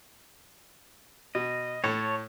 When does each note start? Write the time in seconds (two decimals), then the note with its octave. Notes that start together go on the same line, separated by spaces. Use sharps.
1.35 B2 D#5
1.84 A2 C#5 A5